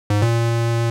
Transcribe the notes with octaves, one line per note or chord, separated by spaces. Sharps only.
G#2
A#2